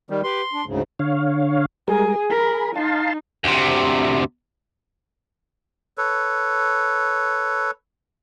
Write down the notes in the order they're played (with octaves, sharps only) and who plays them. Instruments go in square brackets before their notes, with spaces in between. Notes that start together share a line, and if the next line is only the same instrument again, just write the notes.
[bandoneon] D#3 G3
[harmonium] G4 B4 [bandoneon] C6
[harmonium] D4
D2 G#2 C#3
[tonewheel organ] D3 C#5 F5
[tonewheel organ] G3 G#3 A#4 [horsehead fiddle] G#4
[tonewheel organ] G#4 B5 [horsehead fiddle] A#4
[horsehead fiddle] D#4 [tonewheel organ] F5 A5 C6
[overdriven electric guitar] D2 C3
[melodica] A4 B4 C#5